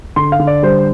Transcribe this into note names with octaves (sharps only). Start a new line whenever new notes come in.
D3 C6
F5
D3
D5
G3 C5